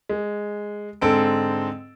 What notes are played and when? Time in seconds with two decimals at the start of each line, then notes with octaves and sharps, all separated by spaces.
0.09 G#3
1.01 G#2 D3 C4 A4 E6 D7